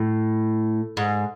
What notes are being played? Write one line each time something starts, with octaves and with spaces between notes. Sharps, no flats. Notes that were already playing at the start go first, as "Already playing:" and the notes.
Already playing: A2
G#2